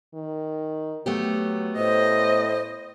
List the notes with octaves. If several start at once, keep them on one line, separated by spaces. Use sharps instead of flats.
D#3
F#3 A3 B3 G4
A2 C5 D#5